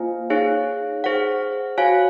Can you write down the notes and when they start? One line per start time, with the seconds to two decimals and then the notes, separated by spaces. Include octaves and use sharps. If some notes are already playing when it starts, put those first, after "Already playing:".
Already playing: A#3 F4 C5 F5 G#5
0.30 D#4 G#4 C#5 F5
1.04 G#4 C5 F#5
1.78 F#4 C#5 F5 G#5